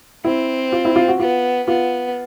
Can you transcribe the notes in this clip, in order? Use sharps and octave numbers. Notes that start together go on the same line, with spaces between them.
C4 E4
F4
E4
F4
F#4
B3 F4
B3 F4